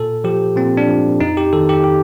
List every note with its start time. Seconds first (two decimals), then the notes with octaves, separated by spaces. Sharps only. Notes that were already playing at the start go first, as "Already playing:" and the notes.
Already playing: A#2 A4
0.24 F3 G4
0.56 A#2 C4
0.77 D4
0.89 F3
1.20 F2 D#4
1.37 G4
1.53 D#3 A4
1.69 G4
1.84 G4